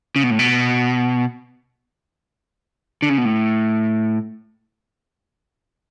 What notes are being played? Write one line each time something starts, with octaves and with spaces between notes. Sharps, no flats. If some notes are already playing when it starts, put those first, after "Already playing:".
C#3
B2
A2
B2
D3
C#3
B2
A2